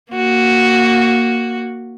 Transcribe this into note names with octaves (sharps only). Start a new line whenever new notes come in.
A#3 F#4